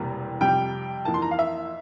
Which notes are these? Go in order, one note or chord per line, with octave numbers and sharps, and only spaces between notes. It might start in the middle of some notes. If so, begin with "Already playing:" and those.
Already playing: E1 E2 C3 G3 A#3
F2 C3 G3 G5
F2 E3 A#3 A5
C6
A#5
F5
E5